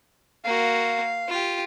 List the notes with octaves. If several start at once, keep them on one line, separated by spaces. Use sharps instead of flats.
A#3 F#4 F5
F4 G4